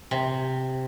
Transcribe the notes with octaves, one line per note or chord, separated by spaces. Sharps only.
C3